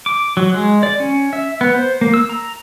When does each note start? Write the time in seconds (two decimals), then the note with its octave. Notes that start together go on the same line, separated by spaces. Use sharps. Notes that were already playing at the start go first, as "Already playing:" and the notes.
0.06 D6
0.37 F#3
0.54 G#3
0.83 D5
1.00 C#4
1.33 E5
1.61 B3
1.75 C5
2.01 A#3
2.14 E6
2.29 A#5